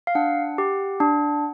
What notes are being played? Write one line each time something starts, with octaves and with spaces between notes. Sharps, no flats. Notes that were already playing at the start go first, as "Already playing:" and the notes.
F5
D4 F#5
G4
D4